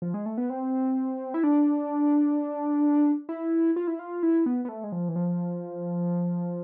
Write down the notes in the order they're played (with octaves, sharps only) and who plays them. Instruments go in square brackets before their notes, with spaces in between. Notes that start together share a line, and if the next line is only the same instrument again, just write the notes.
[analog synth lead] F3
G#3
A3
B3
C4
E4
D4
E4
F4
E4
F4
E4
B3
B3
A3
G#3
F3
E3
F3